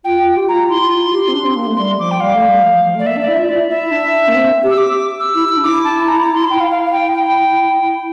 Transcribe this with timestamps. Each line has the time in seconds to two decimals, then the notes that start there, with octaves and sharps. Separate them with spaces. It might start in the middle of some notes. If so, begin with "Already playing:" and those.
0.05 F4 G5
0.37 G4
0.48 F4 A#5
0.70 E4 C6
0.92 F4
1.13 G4
1.28 C4
1.34 D4
1.45 C4
1.56 A#3
1.67 A3
1.77 G3 C6
1.98 F3 D6
2.11 G5
2.20 G3 F5
2.34 A3
2.49 G3
2.63 F3
2.74 F3
2.85 F3
2.95 A3 D5
3.05 A#3 E5
3.16 D4 D5
3.28 E4
3.34 F4 E5
3.48 E4 D5
3.70 E5
3.81 E4
3.91 D4
4.28 A#3
4.35 C4
4.64 G4
4.71 E6
4.78 G4 D6
5.20 E6
5.35 E4
5.49 E4
5.57 D4
5.64 E4 D6
5.85 A5
6.06 A#5
6.21 A#5
6.35 C6
6.49 E4 G5
6.60 F5
6.71 F5
6.86 F5
6.93 G5
7.14 G5